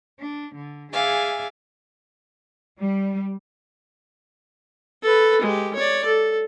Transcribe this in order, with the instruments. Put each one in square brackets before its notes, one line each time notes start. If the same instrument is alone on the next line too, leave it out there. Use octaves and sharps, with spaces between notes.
[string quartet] D4
D3
G#4 D5 E5 F5 G#5
[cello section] G3
[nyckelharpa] A4 B4
G#3 G4
C#5 D5
A4